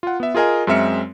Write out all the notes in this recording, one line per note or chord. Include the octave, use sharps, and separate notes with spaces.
F4 F#5
B3 E5
F4 G#4 A#4 D#5 G#5
F#2 G#3 C4 E5 F6 C#7